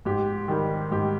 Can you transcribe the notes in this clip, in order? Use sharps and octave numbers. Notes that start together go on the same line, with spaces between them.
G#2 G4
D#3 G3
G#2 G4